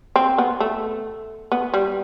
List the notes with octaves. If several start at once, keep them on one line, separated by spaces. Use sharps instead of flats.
C4
B3
A3
B3
G3